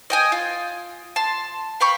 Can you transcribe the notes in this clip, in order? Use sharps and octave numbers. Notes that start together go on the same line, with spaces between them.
D#5 G5 G#5
F4
A5 C6
F5 G5 B5 C#6